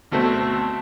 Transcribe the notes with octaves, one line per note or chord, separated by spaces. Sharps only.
D2 B2 A3 C4